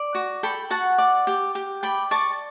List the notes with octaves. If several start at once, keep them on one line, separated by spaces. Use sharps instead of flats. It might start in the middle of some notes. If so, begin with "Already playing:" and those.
Already playing: D5
F#4
A4 G5 B5
F#4 F#5 A5
D5
G4
G4
D5 G5 B5
D5 A5 C#6